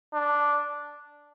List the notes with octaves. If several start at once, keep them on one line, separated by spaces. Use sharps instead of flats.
D4